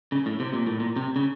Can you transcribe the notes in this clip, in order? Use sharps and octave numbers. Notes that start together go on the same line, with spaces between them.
C#3
A2
C3
A#2
A2
A#2
C3
C#3